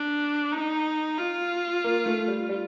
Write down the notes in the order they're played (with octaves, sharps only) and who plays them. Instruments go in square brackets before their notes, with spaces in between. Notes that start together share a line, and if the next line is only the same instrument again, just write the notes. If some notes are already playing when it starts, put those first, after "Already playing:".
Already playing: [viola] D4
D#4
F4
[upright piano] A#3
A3
G3
G3